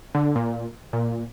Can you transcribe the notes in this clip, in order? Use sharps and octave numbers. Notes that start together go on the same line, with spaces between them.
D3
A#2
A#2